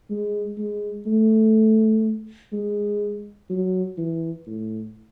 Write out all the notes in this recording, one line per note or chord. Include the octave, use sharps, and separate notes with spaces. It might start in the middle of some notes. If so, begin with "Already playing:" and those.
G#3
G#3
A3
G#3
F#3
E3
A2